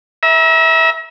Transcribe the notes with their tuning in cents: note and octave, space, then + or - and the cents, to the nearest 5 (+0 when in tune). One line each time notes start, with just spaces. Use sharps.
E5 -15 A#5 +40